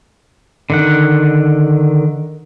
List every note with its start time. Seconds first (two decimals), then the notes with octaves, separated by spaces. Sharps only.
0.70 D3 D#3 F#5